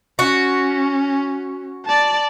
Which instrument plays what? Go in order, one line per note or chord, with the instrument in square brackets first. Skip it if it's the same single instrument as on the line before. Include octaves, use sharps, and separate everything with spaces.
[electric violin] C#4 [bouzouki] F#4
[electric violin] D5 A5